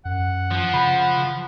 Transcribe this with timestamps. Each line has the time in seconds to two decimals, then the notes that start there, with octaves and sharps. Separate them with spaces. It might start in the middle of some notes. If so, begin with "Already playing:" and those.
0.05 F#2 F#5
0.51 F3
0.74 C#3 B5